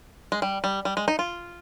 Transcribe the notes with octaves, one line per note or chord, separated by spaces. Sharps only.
G#3
G3
G3
G3
G#3
D#4
F4